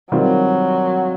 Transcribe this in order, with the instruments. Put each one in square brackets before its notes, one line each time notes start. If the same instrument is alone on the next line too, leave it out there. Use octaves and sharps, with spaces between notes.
[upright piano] D#3 G3 C4 F4 [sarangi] F#3